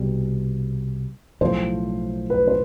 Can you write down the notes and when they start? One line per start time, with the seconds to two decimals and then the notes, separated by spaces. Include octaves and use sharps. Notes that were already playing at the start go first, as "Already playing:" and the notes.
Already playing: C2 B2 G3
1.41 B1 A2 F3 C5
2.30 B4
2.47 C5